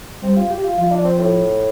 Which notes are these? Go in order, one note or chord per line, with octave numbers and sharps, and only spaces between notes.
G3 C4
F4
G4
F4
F3 F4
D4
C4
A2